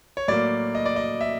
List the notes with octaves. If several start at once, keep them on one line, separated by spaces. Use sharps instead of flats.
C#5
A2 F#3 A#3 D5
D#5
D5
D#5
E5